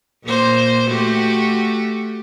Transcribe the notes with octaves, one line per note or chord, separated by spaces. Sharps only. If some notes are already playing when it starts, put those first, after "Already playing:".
A#2 A#3 C5
A3 F#4 G4